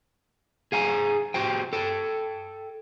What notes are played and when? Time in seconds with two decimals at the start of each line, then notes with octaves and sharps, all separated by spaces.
0.72 G#4 F5 G#5 A#5
1.34 F#4 G4 C5 G5
1.73 A4 G5